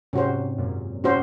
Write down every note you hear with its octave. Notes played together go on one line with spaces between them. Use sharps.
G#2 C3 C#4 F#4 C5
F#2 A#2
C#4 F#4 C5